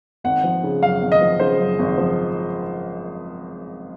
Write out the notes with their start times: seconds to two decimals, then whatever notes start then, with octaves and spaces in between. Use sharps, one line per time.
0.24 G#1 F#5
0.44 F3
0.63 C#3
0.82 F#2 F5
1.02 G#1
1.12 D#5
1.21 F3
1.40 C#3 C5
1.59 F#2
1.79 G#1
1.98 F3